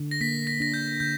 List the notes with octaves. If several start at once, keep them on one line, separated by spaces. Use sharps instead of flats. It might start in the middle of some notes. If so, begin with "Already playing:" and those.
Already playing: D3
A#6
A#3 B6
A#6
D4 A#6
G6
D3 G6